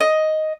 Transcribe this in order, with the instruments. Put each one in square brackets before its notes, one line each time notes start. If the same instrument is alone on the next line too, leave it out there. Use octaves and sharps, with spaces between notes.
[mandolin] D#5